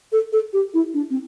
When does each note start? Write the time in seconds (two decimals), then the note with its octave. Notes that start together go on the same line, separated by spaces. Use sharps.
0.12 A4
0.33 A4
0.53 G4
0.74 E4
0.94 D4
1.10 C4